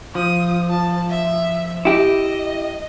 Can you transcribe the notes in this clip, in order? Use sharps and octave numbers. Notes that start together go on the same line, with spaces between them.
F3 D#6
A5
E5
E4 G4 D#5